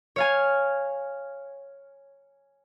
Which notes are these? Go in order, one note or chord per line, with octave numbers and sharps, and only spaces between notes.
C#5 F5 G#5